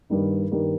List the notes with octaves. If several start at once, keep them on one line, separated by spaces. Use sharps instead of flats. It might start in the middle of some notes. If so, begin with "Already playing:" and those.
G2 D#3 G3 A#3 D#4
G2 D#3 G3 A#3 D#4